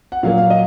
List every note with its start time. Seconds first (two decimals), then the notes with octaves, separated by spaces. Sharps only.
0.12 F#5
0.23 A#2 F#3 A#3 F5
0.38 F5
0.50 D#5